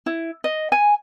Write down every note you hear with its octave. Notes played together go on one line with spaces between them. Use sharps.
E4
D#5
G#5